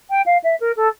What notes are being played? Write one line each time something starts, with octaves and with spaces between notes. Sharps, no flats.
G5
F5
E5
A#4
A4